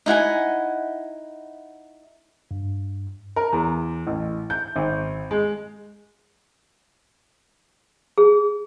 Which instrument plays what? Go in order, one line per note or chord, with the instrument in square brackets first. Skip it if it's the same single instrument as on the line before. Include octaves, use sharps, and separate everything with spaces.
[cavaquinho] D#4 E4 F#5 G#5
[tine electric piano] G2
[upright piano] A#4
E2
A1
G6
G#1
G#3
[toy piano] G#4